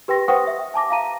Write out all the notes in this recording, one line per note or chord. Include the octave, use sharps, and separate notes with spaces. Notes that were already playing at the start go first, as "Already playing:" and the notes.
G4 B4 G5 C6 A#6
B4 C5 F#5 G5 C#6 D#6
E5
G#5 A5 D6 A#6
F5 A5 A#5 D#7